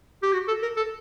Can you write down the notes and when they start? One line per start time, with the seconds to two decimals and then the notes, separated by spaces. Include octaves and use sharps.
0.22 G4
0.33 F#4
0.48 A4
0.62 A#4
0.76 A4